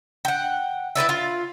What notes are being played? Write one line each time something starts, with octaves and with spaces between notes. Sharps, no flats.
F#5 G5
E4 B4 D5 E5
F4